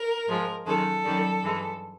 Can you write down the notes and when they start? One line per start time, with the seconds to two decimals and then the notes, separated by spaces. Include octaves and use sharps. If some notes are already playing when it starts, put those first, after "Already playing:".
Already playing: A#4
0.27 G#2 F3 G#3
0.65 F#2 D#3 G#3 A4
1.04 F#2 D#3 G3
1.42 G2 E3 G#3